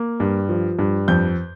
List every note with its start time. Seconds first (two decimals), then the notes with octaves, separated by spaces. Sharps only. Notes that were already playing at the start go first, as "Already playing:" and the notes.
Already playing: A#3
0.20 G2
0.49 F3
0.79 G2
1.08 F2 G6